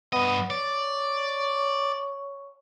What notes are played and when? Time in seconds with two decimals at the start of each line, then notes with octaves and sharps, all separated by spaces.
0.13 G2 B3 D#5
0.50 C#5 D5